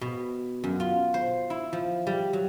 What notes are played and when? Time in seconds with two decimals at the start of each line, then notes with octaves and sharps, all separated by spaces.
0.01 B2
0.64 F#2
0.80 F4
1.14 C5
1.50 E4
1.73 F3
2.07 G3
2.33 F#3